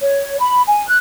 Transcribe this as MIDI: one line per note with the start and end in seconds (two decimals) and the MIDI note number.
0.01 0.39 73
0.41 0.62 83
0.67 0.87 80
0.88 0.96 90